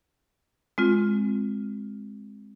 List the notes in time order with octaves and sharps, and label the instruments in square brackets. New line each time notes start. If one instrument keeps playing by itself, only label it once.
[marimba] G#3 C4 F4